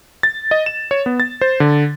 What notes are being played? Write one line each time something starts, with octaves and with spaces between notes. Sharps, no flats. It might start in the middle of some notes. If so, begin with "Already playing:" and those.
A6
D#5
E7
C#5
B3
A6
C5
D3